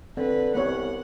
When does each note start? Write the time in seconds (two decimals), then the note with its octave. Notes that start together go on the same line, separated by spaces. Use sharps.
0.17 D3 C4 B4
0.55 C2 B3 C#5 F#5